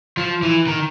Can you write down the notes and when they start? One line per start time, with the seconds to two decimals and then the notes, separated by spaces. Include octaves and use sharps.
0.17 F3
0.42 E3
0.67 D#3